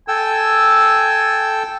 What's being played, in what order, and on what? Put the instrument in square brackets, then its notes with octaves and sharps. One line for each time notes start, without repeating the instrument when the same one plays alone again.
[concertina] A4 G5 E6 [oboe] G#5